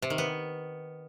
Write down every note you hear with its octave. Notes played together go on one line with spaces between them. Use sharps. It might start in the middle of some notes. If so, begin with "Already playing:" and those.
C3
D#3
B3